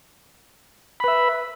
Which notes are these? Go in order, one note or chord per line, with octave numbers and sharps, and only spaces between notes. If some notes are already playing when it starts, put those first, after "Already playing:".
B4 E5 B5